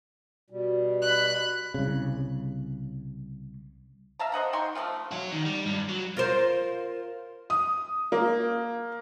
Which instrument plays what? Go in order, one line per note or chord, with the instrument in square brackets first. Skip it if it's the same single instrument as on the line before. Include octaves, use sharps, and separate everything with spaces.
[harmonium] B2 G3
[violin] B5 F#6
[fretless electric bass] C2 C#3
[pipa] E5 F5 A5 A#5
C5 D#5 F#5 A#5
D#4 G5 C6 C#6
F3 A3 C4 F4
[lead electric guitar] F#4 C#5
D#3
G3
G2
F#3
[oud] F4 A#4 C5
[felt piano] D#6
A#3